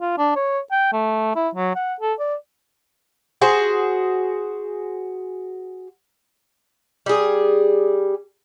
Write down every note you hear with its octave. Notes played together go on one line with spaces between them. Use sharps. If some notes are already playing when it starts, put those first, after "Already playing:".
F4
D4
C#5
G5
A3
E4
F#3
F#5
A4
D5
F#4 G#4 C5
G3 G#4